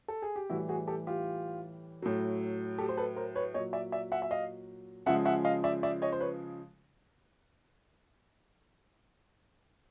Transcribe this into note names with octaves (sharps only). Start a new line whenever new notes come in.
A4
G#4
G4
A2 E3 G3 E4 F#4
F#4 G#4
G4 A4
F4 G4
A2 F#3
G4 A4
C5
A4 B4
A#4 C5
B4 C#5
A#2 F#3 C#5 D#5
D5 E5
D5 E5
E5 F#5
E5
D#5 F5
C#3 F3 G#3 E5 F#5
E5 F#5
D#5 F5
D5 E5
D5 E5
C#5 D#5
C5
B4 C#5